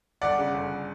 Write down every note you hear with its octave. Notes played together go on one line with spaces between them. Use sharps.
G1 D5 F#5
C#3
G1